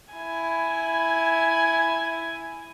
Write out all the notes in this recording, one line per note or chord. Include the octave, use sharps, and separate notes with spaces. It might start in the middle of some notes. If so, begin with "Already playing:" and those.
E4 G#5